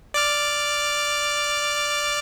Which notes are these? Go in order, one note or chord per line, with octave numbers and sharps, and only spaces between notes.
D5 D6 F6